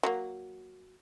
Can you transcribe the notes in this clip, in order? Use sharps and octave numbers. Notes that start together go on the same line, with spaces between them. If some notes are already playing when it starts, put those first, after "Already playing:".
F#3 G#3 A#3